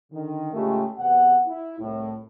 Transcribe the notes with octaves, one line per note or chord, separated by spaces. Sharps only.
D3 D#3
A2 C#3 G#3 A3 F4 G4
E2 C3 B3 F#5
E4
C2 A2